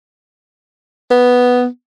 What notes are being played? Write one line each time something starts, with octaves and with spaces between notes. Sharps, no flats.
B3